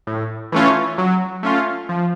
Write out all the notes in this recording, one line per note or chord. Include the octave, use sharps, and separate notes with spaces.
A2
E3 A3 C#4 F4
F#3
A3 C#4 F4
F3